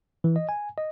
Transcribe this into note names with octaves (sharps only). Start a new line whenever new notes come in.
E3
D#5
G#5
D#5